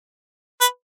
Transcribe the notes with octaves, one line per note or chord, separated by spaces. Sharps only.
B4